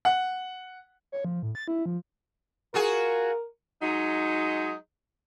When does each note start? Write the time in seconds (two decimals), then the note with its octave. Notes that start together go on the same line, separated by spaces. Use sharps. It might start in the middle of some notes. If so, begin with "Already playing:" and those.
0.05 F#5
1.12 C#5
1.25 F3
1.43 A2
1.55 A6
1.68 E4
1.86 F3
2.74 F4 F#4 G#4 A#4
3.82 F#3 G#3 D#4